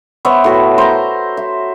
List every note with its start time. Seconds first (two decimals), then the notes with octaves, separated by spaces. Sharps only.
0.25 B3 C5 C#5 E5
0.44 A2 F#4 B4
0.78 C5 A#5
1.37 E5